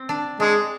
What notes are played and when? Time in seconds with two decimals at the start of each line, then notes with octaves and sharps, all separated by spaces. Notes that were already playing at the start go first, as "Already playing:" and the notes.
Already playing: C4
0.09 D4
0.40 G#3 D4